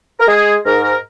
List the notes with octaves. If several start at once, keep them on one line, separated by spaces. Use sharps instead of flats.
A#4
G#3 G#4
G#2 A#4
A#4